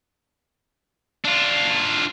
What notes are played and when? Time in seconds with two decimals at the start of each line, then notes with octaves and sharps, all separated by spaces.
1.25 D4 F4